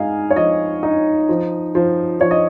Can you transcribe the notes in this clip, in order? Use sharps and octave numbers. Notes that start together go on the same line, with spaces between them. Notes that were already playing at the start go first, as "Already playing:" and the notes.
Already playing: G#3 D#4 D#5 F5 G#5
C#5
F3 D#5
D#4
F3
F3
F3 C#5
D#5